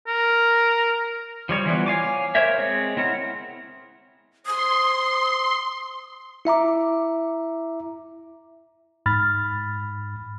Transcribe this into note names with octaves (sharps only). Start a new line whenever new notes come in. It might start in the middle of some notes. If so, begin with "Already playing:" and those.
A#4
F3 G3 C#5
E3 F3 G3 B3
C#5 F5 G#5 D6
A#4 C5 C#5 E5
G#3 C4 C#5
C4 E4 A#4 F#5
C5 C6 D#6
E4 E5 A#5 D6
G#2 B5 F6 A6